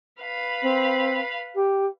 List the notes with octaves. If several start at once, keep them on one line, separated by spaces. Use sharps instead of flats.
B4 F5 B5
C4
G4